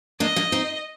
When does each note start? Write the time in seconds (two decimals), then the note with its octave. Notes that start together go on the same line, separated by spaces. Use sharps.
0.20 A#3 D4 D#5
0.36 A#3 D4
0.52 C4 D#4